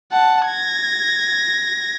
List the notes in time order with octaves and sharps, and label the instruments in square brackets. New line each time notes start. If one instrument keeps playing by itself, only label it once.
[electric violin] F#5 A5
G#6 A#6